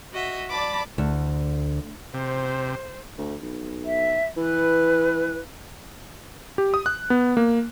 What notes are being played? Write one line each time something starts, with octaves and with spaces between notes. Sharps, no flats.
F#4 D#5 E5
D5 A5 B5 D6 A6
D2
C3 C5
D2
B1
E5
E3 B4
G4
D#6
F#6
B3
A#3